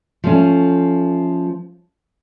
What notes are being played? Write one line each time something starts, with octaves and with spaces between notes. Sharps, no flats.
F3 A3 C#4